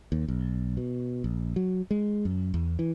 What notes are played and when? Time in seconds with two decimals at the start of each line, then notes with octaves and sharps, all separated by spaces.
0.12 D#2
0.28 B1
0.77 B2
1.24 A#1
1.56 F#3
1.91 G#3
2.25 F#2
2.54 E2
2.79 E3